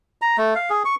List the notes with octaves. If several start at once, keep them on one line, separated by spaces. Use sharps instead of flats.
A#5
A3
F5
G#4
C#6